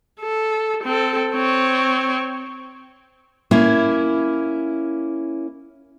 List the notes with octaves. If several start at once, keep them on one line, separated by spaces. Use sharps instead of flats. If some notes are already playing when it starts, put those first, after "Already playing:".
A4
C4 A4
C4 C#5
A#3 C#4 E4